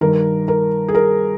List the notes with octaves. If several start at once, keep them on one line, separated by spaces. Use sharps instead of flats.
G2 D#3 A#4
A#4
G#4
A#4